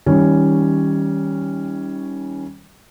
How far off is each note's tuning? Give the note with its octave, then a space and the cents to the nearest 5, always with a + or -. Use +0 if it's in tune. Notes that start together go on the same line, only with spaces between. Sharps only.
D#3 +35 G3 +0 C#4 +0